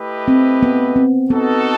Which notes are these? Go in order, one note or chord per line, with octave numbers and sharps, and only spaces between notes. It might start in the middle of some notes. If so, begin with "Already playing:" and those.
Already playing: A3 E4 G4 B4 D#5
C4
B3
C4
B3 D#4 F#4 A4